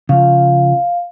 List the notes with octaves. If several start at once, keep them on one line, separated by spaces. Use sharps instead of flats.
C#3 F3 F5